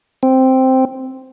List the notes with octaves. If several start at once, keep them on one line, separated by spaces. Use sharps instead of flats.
C4